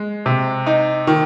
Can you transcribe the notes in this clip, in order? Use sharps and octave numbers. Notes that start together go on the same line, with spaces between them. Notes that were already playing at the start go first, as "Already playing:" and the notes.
Already playing: G#3
C3
D#4
D#3